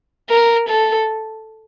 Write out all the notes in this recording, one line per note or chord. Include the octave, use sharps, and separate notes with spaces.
A#4
A4